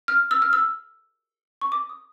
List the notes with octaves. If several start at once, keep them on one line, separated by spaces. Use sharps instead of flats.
F6
E6
F6
E6
C#6
D6
D#6